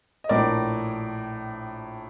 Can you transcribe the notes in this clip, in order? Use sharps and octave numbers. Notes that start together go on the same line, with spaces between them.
D#5
A#1 A2 A#4 D5